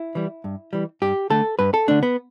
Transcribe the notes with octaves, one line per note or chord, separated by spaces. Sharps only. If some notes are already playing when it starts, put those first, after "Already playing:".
Already playing: E4
E3 G3
G2
E3 G3
G2 G4
D3 A3 A4
G2 B4
A4
D3 A3 D4
B3